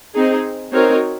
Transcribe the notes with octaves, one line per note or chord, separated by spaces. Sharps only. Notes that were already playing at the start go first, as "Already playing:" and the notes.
C4 D#4 G#4
C4 D#4 F#4 A#4 C#5